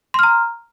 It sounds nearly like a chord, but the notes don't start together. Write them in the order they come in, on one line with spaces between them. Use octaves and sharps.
C6 F6 A#5